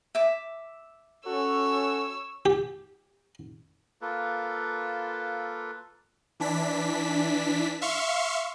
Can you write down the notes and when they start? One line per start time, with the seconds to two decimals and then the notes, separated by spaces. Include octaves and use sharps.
0.15 E5 D6
1.26 C#4 F#4 A4 C#5 E6
2.46 G4
4.02 A#3 F4 A4 B4
6.40 E3 D4 B6
7.81 E5 F5 C6 C#6